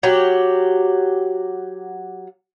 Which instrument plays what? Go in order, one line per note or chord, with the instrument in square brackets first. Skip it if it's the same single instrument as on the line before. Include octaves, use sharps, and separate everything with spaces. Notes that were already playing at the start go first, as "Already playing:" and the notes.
[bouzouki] F#3 G4